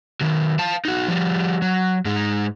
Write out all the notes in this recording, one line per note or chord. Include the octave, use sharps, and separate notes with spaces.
D#3 F#3
F5 A5
D#4 F#4
F3 G3
F#3
G#2 G#3 D#4